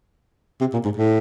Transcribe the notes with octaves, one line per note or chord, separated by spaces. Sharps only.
C3
A#2
G#2
A2